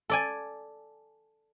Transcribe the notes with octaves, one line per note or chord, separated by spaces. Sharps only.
A4 D5 G#5